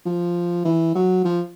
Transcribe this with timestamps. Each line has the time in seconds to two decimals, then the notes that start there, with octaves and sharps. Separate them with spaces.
0.06 F3
0.65 E3
0.95 F#3
1.25 F3